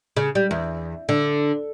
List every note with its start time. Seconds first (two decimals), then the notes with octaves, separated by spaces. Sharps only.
0.17 C#3
0.35 G3
0.51 E2
1.09 D3